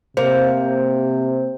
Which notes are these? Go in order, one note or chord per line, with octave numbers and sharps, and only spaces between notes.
C3 A#3 C5